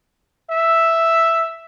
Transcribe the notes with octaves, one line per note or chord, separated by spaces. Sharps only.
E5